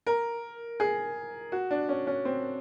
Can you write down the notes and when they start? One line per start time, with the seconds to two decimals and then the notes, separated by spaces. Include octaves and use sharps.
0.07 A#4
0.80 G#4
1.52 F#4
1.71 D4
1.89 C#4
2.07 C#4
2.25 C4